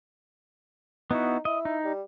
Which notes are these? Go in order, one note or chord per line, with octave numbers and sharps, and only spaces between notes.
B3 D#4 E4 F#4
E4 D#5
D#4
G3